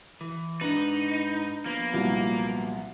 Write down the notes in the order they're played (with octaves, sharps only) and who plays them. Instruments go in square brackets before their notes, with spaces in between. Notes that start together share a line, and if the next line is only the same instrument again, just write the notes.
[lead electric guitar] E3
[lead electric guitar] G#2 B4 [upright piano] D4 [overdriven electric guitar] D#4
[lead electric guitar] F3 B3 [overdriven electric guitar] A#3
[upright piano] C2 A#2 F#3